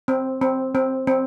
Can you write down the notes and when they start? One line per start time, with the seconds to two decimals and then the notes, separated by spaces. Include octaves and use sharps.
0.08 C4
0.41 C4
0.75 C4
1.07 C4